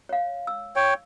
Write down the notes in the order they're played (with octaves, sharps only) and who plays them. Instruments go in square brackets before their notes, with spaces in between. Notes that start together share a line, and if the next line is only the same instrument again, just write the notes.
[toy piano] C#5 F5
E6
[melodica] C#5 G5